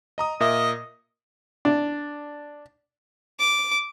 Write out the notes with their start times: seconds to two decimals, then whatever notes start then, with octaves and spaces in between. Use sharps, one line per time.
0.18 D#5 A#5 D#6
0.40 A#2 A#4 D#5 E5
1.65 D4
3.39 D6